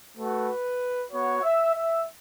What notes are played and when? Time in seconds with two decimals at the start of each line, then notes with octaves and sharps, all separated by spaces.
0.18 A3 F#4 B4
1.11 B3 F#4 C#5
1.43 E5
1.74 E5